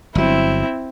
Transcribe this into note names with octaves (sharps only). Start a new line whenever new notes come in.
G1 F#3 C4 E4